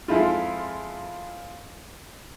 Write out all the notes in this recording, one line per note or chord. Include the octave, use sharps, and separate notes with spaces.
F2 G#3 E4 F4